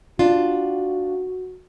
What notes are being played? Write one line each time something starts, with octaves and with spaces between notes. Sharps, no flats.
D4 F4 F#4